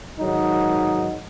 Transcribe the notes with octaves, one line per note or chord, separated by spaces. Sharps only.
G#2 D#3 F#3 D#4